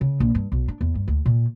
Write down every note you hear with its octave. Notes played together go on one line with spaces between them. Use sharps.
C#3
A#1
G2
B1
D4
E2
G2
D2
A#2